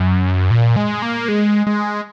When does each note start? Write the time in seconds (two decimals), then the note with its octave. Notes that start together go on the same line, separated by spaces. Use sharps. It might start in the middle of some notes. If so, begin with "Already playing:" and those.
Already playing: F#2
0.51 A#2
0.76 G#3
1.02 A#3
1.28 G#3
1.67 G#3